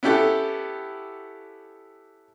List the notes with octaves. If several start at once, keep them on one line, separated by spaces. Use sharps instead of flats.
B3 C#4 E4 G4 A4